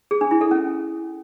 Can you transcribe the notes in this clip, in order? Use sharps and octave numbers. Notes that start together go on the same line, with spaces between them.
G#4
D4
E4
A4
C#4